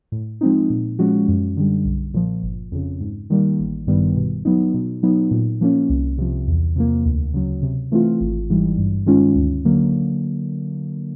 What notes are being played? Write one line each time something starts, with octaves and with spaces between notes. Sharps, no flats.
A2
F3 G#3 C4 D#4
A#2
F3 G#3 C#4 F#4
F#2
D3 G3
B1
A#2 F3
G1
F2 C#3
G#2
D#3 G3 A#3
A1
G2 D#3 G3 B3
B2
F#3 B3 D#4
B2
F#3 B3 D#4
A#2
F3 A#3 C#4
C2
C3 F3
E2
C3 F3 A#3
D2
C#3 F#3
C3
E3 A3 C4 F4
G#1
G#2 E3 G3
G2
D#3 G#3 C#4 F4
D2
D3 F#3 A#3